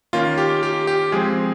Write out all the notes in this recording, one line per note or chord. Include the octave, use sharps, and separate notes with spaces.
D#3 A#3 C#4 F4
G4
G4
G4
F3 G#3 C4 G#4